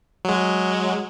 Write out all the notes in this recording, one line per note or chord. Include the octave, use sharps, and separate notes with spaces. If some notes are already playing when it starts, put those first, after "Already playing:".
F#3 G#3